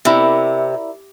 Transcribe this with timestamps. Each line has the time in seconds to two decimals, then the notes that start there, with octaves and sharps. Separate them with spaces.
0.05 C3 E4 A#4 D5